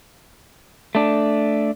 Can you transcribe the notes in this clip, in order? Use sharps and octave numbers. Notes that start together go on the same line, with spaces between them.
A3 D4